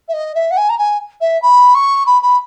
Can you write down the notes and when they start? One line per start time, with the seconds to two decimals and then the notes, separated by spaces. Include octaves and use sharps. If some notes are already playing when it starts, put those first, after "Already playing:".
0.08 E5
0.13 D#5
0.35 E5
0.51 F#5
0.57 G#5
0.69 A#5
0.78 G#5
1.21 E5
1.42 B5
1.74 C#6
2.06 B5
2.22 B5